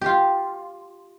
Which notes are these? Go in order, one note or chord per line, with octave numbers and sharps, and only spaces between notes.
F4 G4